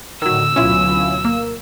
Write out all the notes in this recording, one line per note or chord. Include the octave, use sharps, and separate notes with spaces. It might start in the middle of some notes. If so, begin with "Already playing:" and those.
A2 D3 D#3 F#3 E6
D2 B2 F#3 C#4 E4 F4
A#3